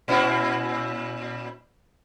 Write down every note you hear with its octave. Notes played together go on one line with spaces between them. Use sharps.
A#2 C#4 E4